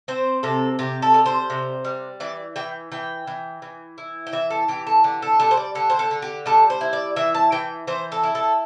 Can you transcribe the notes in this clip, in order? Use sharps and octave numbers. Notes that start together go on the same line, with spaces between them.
C4 C5
C3 A4
C3 G4
A4
G3
C5
C3
G3
E3 D5
E3 G5
E3 G5
E3
E3
E4
G5
E3 E5
A4
E3 G4
A4
D3 G4
A4
G3 A4
C5
D5
D3 A4
C5
A4
D3
G4
G3 A4
C5
E4
D5
E3 E5
A5
E3 G5
E3 C5
A4
E4
A4